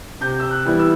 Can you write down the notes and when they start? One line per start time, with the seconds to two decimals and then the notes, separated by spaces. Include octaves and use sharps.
0.21 C3 G6
0.40 E6
0.51 F#6
0.65 E3 G3 B3 E4
0.80 E6